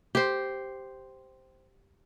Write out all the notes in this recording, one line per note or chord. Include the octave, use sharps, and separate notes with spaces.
G4 C5